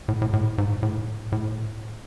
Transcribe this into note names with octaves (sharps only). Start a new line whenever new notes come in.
A2
A2
A2
G#2
A2
A2